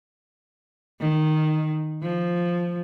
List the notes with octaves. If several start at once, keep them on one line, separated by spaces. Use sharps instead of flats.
D#3
F3